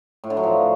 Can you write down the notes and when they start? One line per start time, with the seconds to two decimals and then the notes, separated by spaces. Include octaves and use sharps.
0.24 A2
0.30 D3
0.37 F#3
0.43 F3